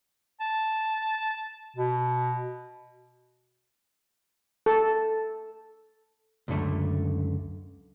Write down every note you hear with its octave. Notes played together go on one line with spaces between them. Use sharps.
A5
B2
A4
C#2 F#2 D3 A3